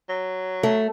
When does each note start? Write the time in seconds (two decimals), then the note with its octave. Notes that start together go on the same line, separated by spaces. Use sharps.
0.09 F#3
0.63 A3